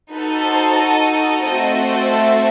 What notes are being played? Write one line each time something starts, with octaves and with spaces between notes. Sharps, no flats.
D#4 F#4 A4 B4
C5
D#5
A3 C4 F#4 A4
E5